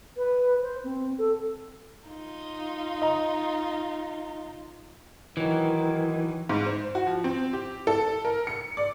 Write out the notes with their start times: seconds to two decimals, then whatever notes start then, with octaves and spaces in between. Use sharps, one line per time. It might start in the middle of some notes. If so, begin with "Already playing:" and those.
0.17 B4
0.62 C5
0.84 C4
1.18 A4
2.10 D#4 F4
3.02 D#5 A#5
5.37 D#3 E3 F#3
6.49 G#2
6.66 C5
6.95 F#4
7.07 F3
7.24 C4
7.53 G4
7.87 A4
8.25 A#4
8.47 C#7
8.77 D5